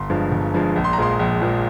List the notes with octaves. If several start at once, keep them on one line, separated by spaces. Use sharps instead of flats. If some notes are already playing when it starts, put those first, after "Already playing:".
Already playing: G1 C6
G2 F3 G#3
G1
G2 F3 G#3
A#1
C6
A#5
A#2 F3 G#3 C6
A#1
A#2 F3 G#3